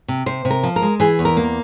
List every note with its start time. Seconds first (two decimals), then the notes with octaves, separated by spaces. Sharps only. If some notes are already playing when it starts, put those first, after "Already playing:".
0.08 C3
0.26 C3 C5
0.45 C3
0.51 A#4
0.63 F3
0.76 A#4
0.82 G#3
1.00 E3 G#4
1.19 E2
1.25 A#4
1.37 A#3